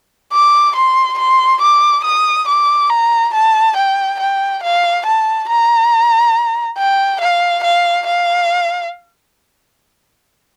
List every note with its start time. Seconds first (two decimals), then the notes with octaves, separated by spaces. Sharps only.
0.32 D6
0.76 C6
1.18 C6
1.61 D6
2.04 D#6
2.48 D6
2.90 A#5
3.34 A5
3.76 G5
4.20 G5
4.63 F5
5.06 A5
5.49 A#5
6.78 G5
7.21 F5
7.64 F5
8.07 F5